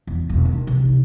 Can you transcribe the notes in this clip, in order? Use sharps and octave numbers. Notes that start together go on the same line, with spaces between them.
E2
E1
D#3
C3
D#4